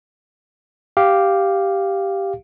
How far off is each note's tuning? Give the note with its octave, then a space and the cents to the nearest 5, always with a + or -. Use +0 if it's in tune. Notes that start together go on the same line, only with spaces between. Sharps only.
G4 +0 F5 +0